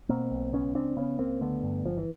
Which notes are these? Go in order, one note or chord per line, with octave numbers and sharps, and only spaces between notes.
B2 A#3 C4
B1
C#2 B3 C#4
C#3 C4 D4
C#3 B3 C#4
C#2 A#3 C4
D3 A3 B3
G2
G1 F3
E3